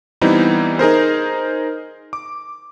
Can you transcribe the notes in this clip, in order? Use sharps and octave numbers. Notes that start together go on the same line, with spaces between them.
E3 G3 B3 C4 D#4 E4
D#4 G#4 A#4 C5
D6